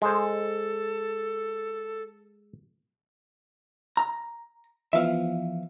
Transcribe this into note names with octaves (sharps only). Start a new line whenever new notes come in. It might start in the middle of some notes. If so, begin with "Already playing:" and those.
G#3 A4 C5
A#5
E3 F3 B3 E5 F5